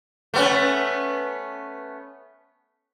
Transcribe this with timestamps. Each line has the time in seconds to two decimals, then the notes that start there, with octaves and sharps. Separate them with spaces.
0.34 A3 B3 C#4